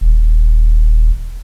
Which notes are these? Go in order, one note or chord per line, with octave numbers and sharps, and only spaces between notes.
D#1